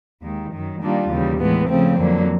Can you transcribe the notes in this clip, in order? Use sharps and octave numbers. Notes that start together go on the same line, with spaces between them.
D#2 D#3 G#3
F#2 D#3 F#3
D#3 G3 A#3 D4 F4
D#2 C#3 E3 G3
A2 E3 G#3 B3
C#3 F3 A3 C4
F2 D3 F#3 A#3